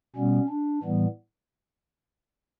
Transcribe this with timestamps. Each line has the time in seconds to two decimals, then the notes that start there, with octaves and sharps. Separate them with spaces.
0.16 B2 G3 B3 C#4
0.49 D4
0.83 A2 E3 G3 B3